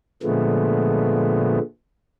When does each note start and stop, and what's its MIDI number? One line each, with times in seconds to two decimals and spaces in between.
0.23 1.59 46
0.23 1.59 50
0.23 1.59 53
0.23 1.59 56
0.23 1.59 57
0.23 1.59 59